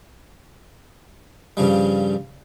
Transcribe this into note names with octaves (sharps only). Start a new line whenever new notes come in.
G2 C#3 F3 G3